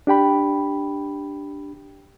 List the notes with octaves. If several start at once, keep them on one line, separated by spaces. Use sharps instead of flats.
D4 G4 G5 B5